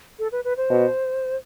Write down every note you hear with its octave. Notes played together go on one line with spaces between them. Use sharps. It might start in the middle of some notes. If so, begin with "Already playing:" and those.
A4
B4
B4
C5
B2